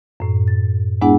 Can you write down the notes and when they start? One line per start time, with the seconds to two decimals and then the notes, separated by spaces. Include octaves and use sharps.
0.20 F#2 A2
0.48 A6
1.01 G#3 B3 D4 E4 G#4 F#5